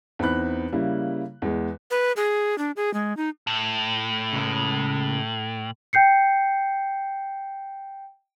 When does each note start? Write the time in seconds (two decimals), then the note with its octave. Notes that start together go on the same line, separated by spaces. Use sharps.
0.19 E2 C4 D#4 B5 F#6
0.72 C#3 G3 A#3 E4
1.42 E2 G#3
1.91 B4
2.16 G#4
2.58 D4
2.76 G#4
2.94 G#3
3.17 D#4
3.47 A2
4.33 C#3 G#3
5.93 G5 G6 C7 C#7